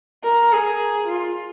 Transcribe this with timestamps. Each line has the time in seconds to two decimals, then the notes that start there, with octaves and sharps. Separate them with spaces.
0.24 A#4
0.52 G#4
1.08 F4